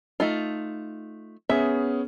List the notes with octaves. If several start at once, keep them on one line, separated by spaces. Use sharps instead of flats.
A3 D#4 F4
B3 C#4 G#4 E5